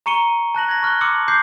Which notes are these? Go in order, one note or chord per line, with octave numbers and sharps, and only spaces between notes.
A#5 C#6 C#7 D#7 G7
A5 F#6 A#6 F#7
G#6 A#6
C#6 F6 F#6 G7
A5 C6 D6 E6 C#7 F#7
D6 G6 C7